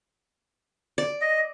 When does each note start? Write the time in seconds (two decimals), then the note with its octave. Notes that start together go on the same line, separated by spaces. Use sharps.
0.98 D5
1.21 D#5